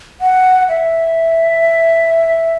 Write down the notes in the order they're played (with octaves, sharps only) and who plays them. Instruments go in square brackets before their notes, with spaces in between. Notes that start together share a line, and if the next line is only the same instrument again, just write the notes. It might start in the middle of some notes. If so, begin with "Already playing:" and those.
[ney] F#5
E5